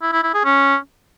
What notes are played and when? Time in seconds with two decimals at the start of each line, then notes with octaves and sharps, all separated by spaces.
0.02 E4
0.13 E4
0.23 E4
0.34 G#4
0.45 C#4